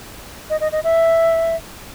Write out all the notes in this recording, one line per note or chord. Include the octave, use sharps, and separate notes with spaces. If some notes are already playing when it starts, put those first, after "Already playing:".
D#5
D#5
D#5
E5